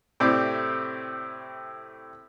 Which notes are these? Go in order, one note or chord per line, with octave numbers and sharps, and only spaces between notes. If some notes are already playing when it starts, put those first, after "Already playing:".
A2 C3 C4 G4 D5 D6